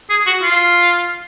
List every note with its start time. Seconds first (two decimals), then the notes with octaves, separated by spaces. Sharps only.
0.10 G#4
0.26 F#4
0.43 F4